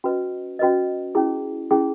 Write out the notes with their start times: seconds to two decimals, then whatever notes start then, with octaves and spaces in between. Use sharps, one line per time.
0.04 C#4 F#4 B4 D#5
0.59 C#4 F#4 B4 D#5
1.15 C#4 E4 G#4
1.71 C#4 E4 G#4